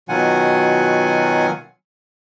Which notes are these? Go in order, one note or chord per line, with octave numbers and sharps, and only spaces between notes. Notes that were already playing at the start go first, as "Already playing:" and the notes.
B2 D#3 F#3 F4 F#5 G#5